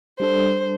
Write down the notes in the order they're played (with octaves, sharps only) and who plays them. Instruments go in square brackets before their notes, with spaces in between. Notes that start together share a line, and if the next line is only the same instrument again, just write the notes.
[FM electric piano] G3 D4 A4 [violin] C5